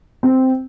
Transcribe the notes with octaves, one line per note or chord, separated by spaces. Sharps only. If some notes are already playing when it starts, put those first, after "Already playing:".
C4